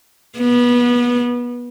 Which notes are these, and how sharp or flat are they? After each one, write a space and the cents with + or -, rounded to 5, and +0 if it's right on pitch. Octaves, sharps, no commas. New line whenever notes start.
B3 -25